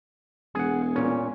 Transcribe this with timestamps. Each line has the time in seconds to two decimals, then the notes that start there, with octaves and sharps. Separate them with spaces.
0.55 E1 G#4 F#5
0.96 A#2 C#4